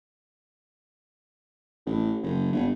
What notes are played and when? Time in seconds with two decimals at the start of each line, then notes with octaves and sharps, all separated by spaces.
1.86 A1
2.23 F#1
2.53 G1